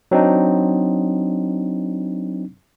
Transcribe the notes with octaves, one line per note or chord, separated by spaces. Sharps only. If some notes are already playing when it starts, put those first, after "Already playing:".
F#3 C4 D4 D#4